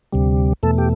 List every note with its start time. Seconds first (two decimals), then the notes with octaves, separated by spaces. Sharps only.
0.13 D2 C3 G3
0.63 E2 B2 A3 A4
0.78 G4